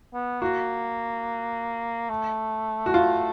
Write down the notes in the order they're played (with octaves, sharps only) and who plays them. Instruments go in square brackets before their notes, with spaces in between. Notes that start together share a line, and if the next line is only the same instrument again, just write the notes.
[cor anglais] B3
[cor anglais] A#3 [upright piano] F#4
[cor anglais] A3
[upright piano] F#4
F4